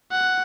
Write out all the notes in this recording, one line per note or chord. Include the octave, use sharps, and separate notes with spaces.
F#5